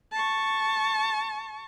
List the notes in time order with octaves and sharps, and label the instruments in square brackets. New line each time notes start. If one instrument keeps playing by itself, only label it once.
[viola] A5 C#6